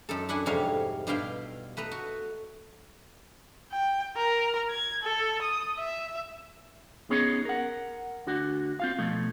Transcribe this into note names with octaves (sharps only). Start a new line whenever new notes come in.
F#2 D#4 A4
D4 E4 F#5 G#5
F2 G#2 C3 G3 C#5 F5
G2 B2 E4 F5 G5
A3 B4 D#5 A#5
F#4
G5
A#4
G#6
A4
D#6
E5
B3 C#4 D#4 G#4 C#5
A#4 F#5
D2 D3 F#4
C4 F4 F5
B2 F3 A3